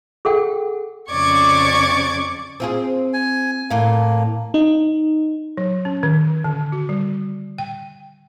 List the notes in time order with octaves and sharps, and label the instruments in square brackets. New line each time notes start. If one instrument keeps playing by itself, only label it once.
[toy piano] G#4 A4 F#5 G5
[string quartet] F2 C#3 D5 C#6 D6 G#6
[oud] C4 F4 G#4
[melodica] G#5
[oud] E2 A2 F5 [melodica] A#3
[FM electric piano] D#4
[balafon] F#3
C#4
D#3
D3
F#4
G3
G5